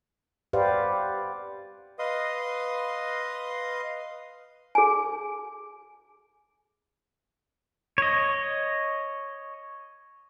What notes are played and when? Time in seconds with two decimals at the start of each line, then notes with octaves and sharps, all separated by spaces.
0.53 G4 B4 C5 D5 F5 F#5
1.99 B4 D#5 F5 C6 D#6
4.75 G#4 G#5
7.98 C#5 D#5